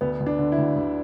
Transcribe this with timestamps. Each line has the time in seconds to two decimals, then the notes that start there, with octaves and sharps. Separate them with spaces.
0.01 D2 B3
0.21 D2
0.26 D4
0.39 D3
0.52 E4
0.58 D2
0.76 D2